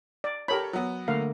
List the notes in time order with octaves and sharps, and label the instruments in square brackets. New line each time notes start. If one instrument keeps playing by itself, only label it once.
[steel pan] D5
[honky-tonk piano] G4 A4 C#5 [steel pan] A#4 B5
[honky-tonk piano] F#3 B3
[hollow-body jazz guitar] D3 A3 A#3 [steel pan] F5